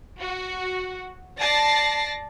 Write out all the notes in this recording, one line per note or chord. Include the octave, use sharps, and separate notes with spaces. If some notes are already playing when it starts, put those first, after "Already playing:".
F#4
D5 A5 A#6 C7